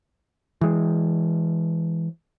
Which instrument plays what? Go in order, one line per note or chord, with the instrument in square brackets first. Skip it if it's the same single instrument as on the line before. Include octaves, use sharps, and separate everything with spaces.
[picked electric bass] E3 G#3